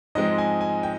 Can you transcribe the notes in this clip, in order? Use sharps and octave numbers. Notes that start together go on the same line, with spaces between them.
G#2 F3 G#3 C4 D#5
G#5
G#5
G5